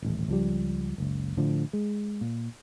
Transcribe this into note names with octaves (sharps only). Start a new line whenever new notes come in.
D#1 A1
C#2 F3 G3
F#1 C#2
A2 D3 F3
G#3
A#2